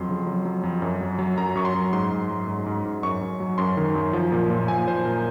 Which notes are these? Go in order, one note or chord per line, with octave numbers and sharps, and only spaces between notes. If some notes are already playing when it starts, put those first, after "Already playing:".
Already playing: F2 F#3 C6
C#3
F#3
F#3
F2
F#2
F#3
F#3
F#2 A#5
F#2 C#6
C6
F#2
G#2 C6
G#2
F#3
G#2
G#2
G#2
F#2 C#6
F#2
F#3
F#2 C6
D#3
F#2
F3
A#2
A#2
A#2 G#5
A#2 C5
A#2 A#4